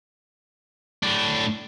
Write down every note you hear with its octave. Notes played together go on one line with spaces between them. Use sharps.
A2 D4